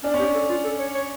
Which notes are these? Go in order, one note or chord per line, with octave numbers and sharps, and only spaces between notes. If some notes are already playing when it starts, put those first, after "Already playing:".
C#4 D4
C#4
G4
D4
A4
F4
A4
C#5
C#5